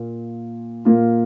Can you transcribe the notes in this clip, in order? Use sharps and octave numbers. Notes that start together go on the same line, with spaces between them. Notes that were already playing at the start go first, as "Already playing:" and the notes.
Already playing: A#2 A#3 F4
A#2 A#3 F4